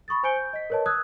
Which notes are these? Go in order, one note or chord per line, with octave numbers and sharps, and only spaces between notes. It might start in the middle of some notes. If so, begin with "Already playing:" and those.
B5 C#6 D#6 A6
C5 G#5 G6 C#7 D7 G7
G6
D#5 B6
A#4 B4 C#5 D#5 A5
D#6 E6 F#6 G#6